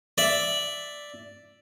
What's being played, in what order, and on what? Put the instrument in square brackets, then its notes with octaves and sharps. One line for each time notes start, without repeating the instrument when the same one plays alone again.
[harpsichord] D5 E5